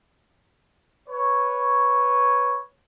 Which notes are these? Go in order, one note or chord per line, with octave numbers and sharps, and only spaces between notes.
B4 C#5